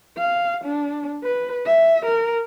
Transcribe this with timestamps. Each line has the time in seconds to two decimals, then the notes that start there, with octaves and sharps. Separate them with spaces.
0.17 F5
0.64 D4
1.23 B4
1.66 E5
2.05 A#4